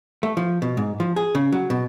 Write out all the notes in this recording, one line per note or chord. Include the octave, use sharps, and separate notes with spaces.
A3
F3
B2
G#2
F3
G#4
C#3
F#3
B2